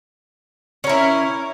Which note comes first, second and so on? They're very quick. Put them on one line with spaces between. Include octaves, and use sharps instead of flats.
C#4 A#4 E4